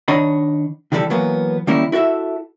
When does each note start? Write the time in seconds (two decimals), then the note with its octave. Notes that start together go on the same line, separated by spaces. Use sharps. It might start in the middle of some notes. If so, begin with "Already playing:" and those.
0.08 D#3 D4 C#5 D#5 B5
0.92 C3 D#3 E3 G3 A4
1.10 E3 F#3 A#3 B3
1.67 D#3 G3 A#3 C#4 E4
1.92 E4 F#4 A4 E5